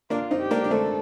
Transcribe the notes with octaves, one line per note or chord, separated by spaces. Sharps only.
A#3 D4 F4
C4 D#4
G4
A#3 D4
D4
A3 C4 A4